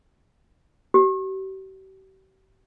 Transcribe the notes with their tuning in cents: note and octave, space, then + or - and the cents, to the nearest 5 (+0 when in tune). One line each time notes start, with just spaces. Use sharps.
G4 -40